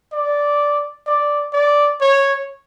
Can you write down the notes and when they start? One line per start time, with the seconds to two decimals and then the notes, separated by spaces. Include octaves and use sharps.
0.13 D5
1.07 D5
1.53 D5
2.01 C#5